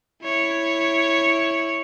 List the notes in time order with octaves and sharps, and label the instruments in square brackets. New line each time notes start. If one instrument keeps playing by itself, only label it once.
[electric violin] E4 C#5